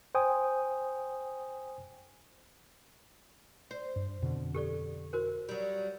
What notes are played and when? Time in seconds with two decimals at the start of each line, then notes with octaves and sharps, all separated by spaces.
0.15 C5 G5 G#5 D#6
3.71 C5
3.96 G2
4.22 F2 B2 D3
4.55 G4 A4 D5
5.13 F#4 A#4 C5
5.49 F#3 G3